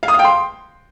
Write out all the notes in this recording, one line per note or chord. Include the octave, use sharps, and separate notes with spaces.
F5
D#6
F5
G5
C6